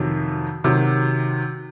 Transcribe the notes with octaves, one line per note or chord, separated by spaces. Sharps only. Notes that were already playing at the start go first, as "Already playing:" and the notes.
Already playing: F2 C3 D#3 F#3
C3 D#3 F#3